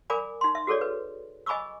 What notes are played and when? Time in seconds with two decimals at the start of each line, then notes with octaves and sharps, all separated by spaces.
0.10 A#4 D5 G#5 B5 D6
0.41 D#4 C6
0.55 E5
0.67 F#4 G#4 A4 C#5 D5
0.81 B4
1.46 D#5 G#5 B5 C#6 D6 E6